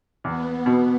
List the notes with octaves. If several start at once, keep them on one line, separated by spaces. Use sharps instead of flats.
E2 B3
B2